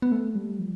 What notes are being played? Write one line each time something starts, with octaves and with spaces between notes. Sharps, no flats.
B3
A3
G3
F3